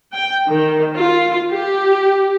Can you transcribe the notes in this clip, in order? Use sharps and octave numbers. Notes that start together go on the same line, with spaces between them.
G5
D#3
F4
G4